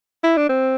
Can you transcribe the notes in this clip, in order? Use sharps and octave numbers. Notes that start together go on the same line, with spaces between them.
E4
D4
C4